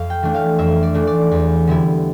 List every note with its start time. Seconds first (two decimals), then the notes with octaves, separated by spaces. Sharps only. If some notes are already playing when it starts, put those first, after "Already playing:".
Already playing: F2 F5
0.10 G5
0.22 E3 A3 D4
0.34 F5
0.58 F2 E5
0.83 D5
0.94 E3 A3 D4
1.07 D5
1.31 E2
1.67 D3 G3 B3 E4